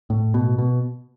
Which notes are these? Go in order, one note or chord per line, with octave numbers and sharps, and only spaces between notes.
A2
B2
B2